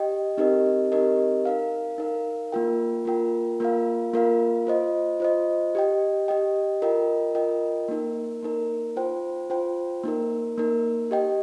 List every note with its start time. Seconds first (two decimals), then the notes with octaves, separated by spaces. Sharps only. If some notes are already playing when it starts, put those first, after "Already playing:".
Already playing: G4 D#5 G5
0.37 C4 D#4 G4 A#4 D#5
0.92 C4 D#4 G4 A#4 D#5
1.45 D#4 A#4 F5
1.98 D#4 A#4 F5
2.52 A#3 F4 A#4 G5
3.05 A#3 F4 A#4 G5
3.60 A#3 F4 A#4 F5
4.13 A#3 F4 A#4 F5
4.67 F4 C5 D#5
5.20 F4 C5 D#5
5.75 G4 D#5 G5
6.28 G4 D#5 G5
6.82 F4 A#4 D#5 G5
7.35 F4 A#4 D#5 G5
7.88 A#3 D#4 A#4
8.43 A#3 D#4 A#4
8.96 F4 C5 G5
9.50 F4 C5 G5
10.04 A#3 D#4 A#4
10.58 A#3 D#4 A#4
11.11 G4 D#5 G5